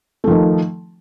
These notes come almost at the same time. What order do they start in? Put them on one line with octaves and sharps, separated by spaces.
A3 F3 D#3